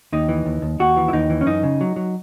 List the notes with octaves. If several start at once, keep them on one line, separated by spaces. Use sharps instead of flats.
D#2 D#4
E3
D#2
D#2
D#2 F#4
E3
E4
D#2 D#4
E3
C#4
F#2 D#4
C#3
F#3
F#3